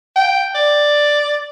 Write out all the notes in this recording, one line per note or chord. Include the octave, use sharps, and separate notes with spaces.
G5
D5